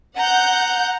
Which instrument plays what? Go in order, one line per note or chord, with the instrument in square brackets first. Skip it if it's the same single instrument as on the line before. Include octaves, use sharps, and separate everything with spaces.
[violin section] F#5 G6 [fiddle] A#5